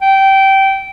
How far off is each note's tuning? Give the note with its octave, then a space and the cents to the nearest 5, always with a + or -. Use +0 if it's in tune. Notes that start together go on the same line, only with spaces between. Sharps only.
G5 -15